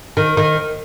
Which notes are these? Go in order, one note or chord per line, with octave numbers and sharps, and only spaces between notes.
D#3
D#3